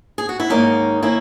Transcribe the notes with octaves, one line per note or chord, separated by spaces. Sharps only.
G#4
F#4
E4
G#2 D#3 A#3 C#4 D#4
D#3 A#3 C#4 E4